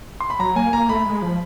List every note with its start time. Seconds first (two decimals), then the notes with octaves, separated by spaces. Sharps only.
0.20 C6
0.30 B5
0.39 F#3 A#5
0.56 A#3 G#5
0.73 A#3 A#5
0.89 A3 B5
1.06 G#3
1.22 F3